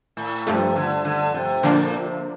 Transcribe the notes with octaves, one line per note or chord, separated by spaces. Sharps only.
A2
G2 C3 F3 A3
D3
D3
C3
A#2 D3 F3 A#3 D4
C3